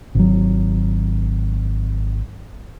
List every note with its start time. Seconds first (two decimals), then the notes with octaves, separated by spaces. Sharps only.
0.15 G#1 F#3